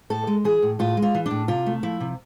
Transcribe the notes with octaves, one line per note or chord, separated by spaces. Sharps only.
A2 A4
G#3
E3 G#4
A2
A2 F4
G#3
F4
E3
A2 D4
C3 F4
A3
F3 E4
C3